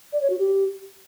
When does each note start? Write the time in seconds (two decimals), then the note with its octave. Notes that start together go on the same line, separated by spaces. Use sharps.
0.13 D5
0.21 C#5
0.30 F#4
0.39 G4